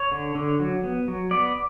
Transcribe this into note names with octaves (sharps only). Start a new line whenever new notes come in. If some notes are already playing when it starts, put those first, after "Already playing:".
Already playing: C#5
D3
D3
F#3
B3
F#3
B3 D5